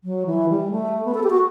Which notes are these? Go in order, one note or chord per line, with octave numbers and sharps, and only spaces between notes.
F#3
E3
G3
A3
B3
A4
G4
F#4